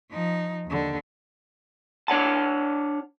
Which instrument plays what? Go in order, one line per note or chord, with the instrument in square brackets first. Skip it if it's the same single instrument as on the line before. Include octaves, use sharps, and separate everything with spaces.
[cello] F3 D#4
D#2 D3
[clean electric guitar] D4 C#5 F#5 A5